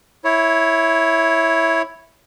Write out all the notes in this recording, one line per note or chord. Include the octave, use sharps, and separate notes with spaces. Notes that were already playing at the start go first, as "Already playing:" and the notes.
E4 C#5